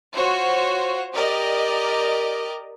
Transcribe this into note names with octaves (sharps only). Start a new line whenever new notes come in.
F4 F#4 C5 C#5
G4 A#4 D5 D#5